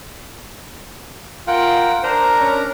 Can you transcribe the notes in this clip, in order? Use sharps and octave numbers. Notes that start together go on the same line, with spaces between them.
F4 A#4 F#5 G5
D4 A#4 C5 A#5
C#4